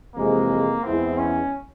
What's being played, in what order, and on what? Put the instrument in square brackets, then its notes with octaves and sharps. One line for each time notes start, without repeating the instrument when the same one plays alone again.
[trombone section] F2 C3 E3 G#3 [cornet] A#3
[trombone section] E2 E3 G#3 E4 [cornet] C4
[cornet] C#4